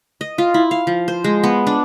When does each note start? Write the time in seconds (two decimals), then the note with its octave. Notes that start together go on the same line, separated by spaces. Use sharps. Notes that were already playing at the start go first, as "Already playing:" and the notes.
0.21 D#5
0.38 F4
0.54 E4
0.71 F5
0.87 F3
1.08 C5
1.24 G#3
1.43 B3
1.67 D4